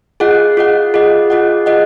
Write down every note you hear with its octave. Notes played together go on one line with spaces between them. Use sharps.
F4 G#4 D#5 F#5
F4 G#4 D#5 F#5
F4 G#4 D#5 F#5
F4 G#4 D#5 F#5
F4 G#4 D#5 F#5